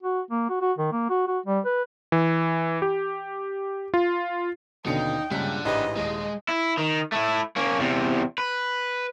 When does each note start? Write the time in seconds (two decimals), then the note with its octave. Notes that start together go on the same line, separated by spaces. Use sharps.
0.03 F#4
0.31 A#3
0.50 F#4
0.62 F#4
0.78 D#3
0.92 A#3
1.10 F#4
1.27 F#4
1.46 G3
1.65 B4
2.12 E3
2.82 G4
3.94 F4
4.86 D#2 B2 D3 C#4 D#4 G5 C#7
5.32 G2 A#2 C#3 G3 G#3 D4 F#5 B6
5.65 A1 G#2 E4 G4 B4 D#5
5.97 D#1 D#2 G#3 D#5
6.48 E4
6.77 D#3
7.12 A3 E4
7.56 A#3 C#4
7.79 E2 C3
8.38 B4